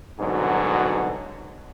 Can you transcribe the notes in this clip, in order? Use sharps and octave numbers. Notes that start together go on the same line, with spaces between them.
C2 G#2 B2 D3 F#3